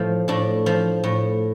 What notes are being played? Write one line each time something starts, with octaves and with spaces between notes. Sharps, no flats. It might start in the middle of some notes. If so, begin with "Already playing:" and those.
Already playing: A2 F3 A3
A2 D4
F3
A2